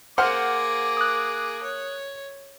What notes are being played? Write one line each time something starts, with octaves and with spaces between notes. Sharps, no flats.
A#3 G#4 C5 F#5 D6 F6
D#6 F#6
C#5